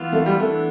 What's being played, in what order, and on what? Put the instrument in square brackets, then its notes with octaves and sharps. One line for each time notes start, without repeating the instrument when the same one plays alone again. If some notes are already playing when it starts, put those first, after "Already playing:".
Already playing: [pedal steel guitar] E3 B3 F4
[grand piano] A3
G3
[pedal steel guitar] E3 B3 D4 [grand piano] A3